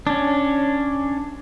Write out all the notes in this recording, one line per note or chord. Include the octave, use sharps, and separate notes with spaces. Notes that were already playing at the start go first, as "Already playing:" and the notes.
C#4 D4